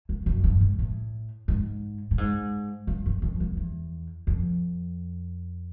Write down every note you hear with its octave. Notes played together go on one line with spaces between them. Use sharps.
F2
F#2
G2
G#2
A2
G#2
A2
G#2
G2
F#2
F2
F2
E2
F2